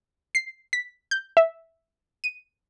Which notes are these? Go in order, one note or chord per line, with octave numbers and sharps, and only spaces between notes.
C7
B6
G6
E5
D#7